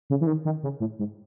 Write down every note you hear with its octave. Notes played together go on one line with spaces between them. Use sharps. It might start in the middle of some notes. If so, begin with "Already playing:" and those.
C#3
E3
D#3
D#3
C#3
A2
G#2